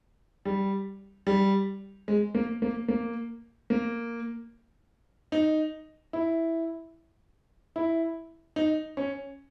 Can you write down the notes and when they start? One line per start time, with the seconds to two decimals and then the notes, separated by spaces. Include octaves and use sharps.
0.45 G3
1.27 G3
2.08 G#3
2.35 A#3
2.62 A#3
2.88 A#3
3.70 A#3
5.32 D#4
6.13 E4
7.76 E4
8.56 D#4
8.97 C#4